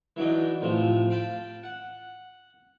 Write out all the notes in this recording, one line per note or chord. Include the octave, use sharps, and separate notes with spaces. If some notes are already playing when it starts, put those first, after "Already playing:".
E3 F#3 D4 D#4
A2 C3 F3
F5 G5 A5 B5
F#5